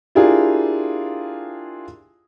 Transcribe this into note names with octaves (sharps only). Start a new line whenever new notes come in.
D4 E4 F4 G4 G#4 A#4